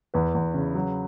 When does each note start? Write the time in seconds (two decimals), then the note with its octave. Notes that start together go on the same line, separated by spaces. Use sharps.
0.14 E2 B4
0.35 E2
0.54 C#3
0.75 F#3